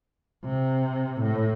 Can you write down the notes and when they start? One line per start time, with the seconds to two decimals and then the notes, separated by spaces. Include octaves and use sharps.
0.45 C3
1.22 A2